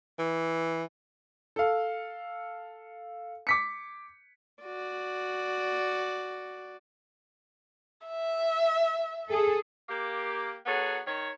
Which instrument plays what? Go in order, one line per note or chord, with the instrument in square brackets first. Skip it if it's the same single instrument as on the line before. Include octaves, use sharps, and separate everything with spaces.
[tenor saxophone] E3
[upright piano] A4 F5
D6 B6 C#7
[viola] F#4 D5
[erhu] E5
[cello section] G#4 A4
[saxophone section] A#3 G4
F#3 B3 G#4 A4 C#5
D#3 C#5